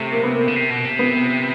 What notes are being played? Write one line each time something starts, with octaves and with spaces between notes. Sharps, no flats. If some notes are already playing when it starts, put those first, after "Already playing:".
Already playing: C3 A3
A#3
B3
A#3
C#3
C3
B2
C3
B3